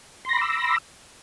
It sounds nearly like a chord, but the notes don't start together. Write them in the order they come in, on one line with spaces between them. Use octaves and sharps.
C6 A#6 B5 D6 E6